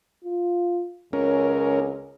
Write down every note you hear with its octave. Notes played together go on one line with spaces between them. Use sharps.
F4
C#2 C#4 A#4